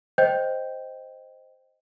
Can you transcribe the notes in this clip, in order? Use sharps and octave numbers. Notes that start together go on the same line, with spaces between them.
C5 D#5 G5 G6